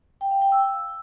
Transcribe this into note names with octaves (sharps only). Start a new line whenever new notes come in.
G5
F5
G5
E6